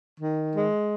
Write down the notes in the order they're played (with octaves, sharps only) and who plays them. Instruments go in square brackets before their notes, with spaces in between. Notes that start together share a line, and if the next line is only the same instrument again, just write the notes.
[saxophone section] D#3
G#3